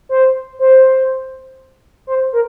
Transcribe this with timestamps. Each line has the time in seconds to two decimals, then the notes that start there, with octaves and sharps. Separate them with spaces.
0.09 C5
0.59 C5
2.07 C5
2.33 A#4